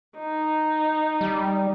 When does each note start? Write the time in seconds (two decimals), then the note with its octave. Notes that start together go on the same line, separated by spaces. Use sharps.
0.18 D#4
1.21 G3